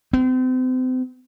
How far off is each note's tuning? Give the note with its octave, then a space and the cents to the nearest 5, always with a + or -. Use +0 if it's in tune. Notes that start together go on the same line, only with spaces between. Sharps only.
C4 -35